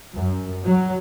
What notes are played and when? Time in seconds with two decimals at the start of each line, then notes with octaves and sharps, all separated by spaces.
0.16 F#2
0.66 F#3